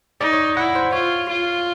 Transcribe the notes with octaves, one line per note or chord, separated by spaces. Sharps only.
D#4 D5
C#5
E4 F#5
C5
F4 C#5
F4